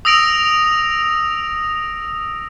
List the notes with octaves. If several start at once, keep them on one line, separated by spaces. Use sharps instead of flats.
D#6 E6 A#6 D7 F7